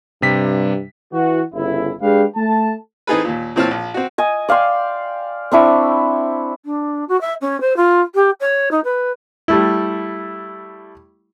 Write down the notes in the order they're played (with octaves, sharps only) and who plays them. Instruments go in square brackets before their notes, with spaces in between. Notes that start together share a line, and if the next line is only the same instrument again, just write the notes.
[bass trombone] G2 [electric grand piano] C3 G3 B6
[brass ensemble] E3 F#4
G1 C#3 E4
G#3 D4 G4 B4 F5
A3 A5
[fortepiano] E3 C4 D#4 G#4 A4 B4
D#2 A#2
A#2 E3 C4 C#5 A5 F6
A#1
C4 F#4
[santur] D#5 G#5
D5 F5 G5 C6
C4 D4 E4 C#6
[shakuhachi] D4
F#4
E5
C#4
C5
F4
G4
C#5
D#4
B4
[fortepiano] G3 A3 E4